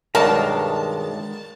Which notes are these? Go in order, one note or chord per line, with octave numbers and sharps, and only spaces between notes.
B1 G2 B2 D#3 G#3 A#4 A5 A#5